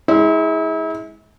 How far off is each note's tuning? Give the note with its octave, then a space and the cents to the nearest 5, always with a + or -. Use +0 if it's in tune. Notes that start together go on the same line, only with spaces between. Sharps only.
G#3 +0 E4 -40